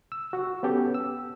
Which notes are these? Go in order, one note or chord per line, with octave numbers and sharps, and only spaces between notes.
E6
F#4 F#5
B3 C#4 G4 A4
E6